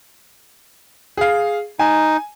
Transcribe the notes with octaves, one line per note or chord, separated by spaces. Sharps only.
G#4 F5
D#4 G#5